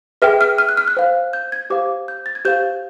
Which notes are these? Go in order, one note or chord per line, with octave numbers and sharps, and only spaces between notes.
G#4 B4 E5 G5 F6
F6
F6
F#6
F6
F#6
C5 F5
G6
G#6
G4 C5 F5 D6
G6
A6
G#6
G4 C5 F5 G6